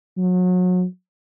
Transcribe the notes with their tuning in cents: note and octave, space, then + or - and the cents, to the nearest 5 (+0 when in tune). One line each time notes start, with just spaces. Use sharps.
F#3 -30